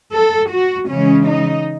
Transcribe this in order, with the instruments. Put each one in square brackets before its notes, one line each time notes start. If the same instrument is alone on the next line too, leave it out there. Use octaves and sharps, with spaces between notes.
[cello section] A4
F#4
C#3 E3 G#3 C#4
D#4